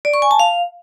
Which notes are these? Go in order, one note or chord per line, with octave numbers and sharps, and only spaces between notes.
D5
C#6
G#5
A5
F5